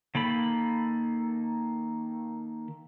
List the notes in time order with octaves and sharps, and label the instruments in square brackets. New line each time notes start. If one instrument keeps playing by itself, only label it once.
[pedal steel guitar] D#3 A#3 A4 B5